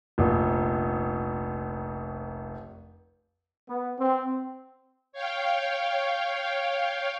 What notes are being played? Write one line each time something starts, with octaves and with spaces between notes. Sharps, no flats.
F1 A#1
B3
C4
C#5 F5 G5